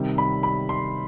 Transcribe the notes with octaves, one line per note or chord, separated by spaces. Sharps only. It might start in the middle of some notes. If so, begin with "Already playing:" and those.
Already playing: C3 D#3 G3
B5
B5
C6